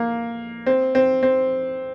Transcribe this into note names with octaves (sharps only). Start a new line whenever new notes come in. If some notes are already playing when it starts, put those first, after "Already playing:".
Already playing: A#3
C4
C4
C4